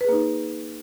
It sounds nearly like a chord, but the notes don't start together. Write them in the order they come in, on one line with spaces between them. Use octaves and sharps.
B4 G#4 A#3 D#4